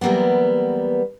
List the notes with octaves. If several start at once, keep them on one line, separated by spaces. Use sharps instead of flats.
E3 F#3 G3 A#3 B3